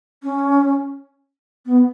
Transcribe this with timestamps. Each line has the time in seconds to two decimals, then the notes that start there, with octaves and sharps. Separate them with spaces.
0.23 C#4
1.66 B3